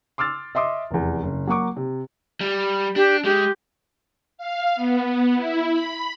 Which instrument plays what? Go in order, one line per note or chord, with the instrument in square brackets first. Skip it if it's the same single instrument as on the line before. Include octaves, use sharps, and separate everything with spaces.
[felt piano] C6 D6 E6 F6 A6
D#5 E5 C6 D6 D#6
F1 E2
F#1
F#3 A#3 F#5 C#6 D6
C3
[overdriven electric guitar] G3
[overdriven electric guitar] D4 [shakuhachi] G4
[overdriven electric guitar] G#3 [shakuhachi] G4
[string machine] F5
B3
E4
B5